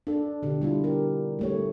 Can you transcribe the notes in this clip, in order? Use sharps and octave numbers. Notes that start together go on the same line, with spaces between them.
D4 A4
B2 D3 G4
G3 E4 F4
G4 A#4
G3 A3 C#5